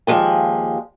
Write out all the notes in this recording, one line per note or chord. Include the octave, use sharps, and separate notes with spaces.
D#2 F3 G#3 G#5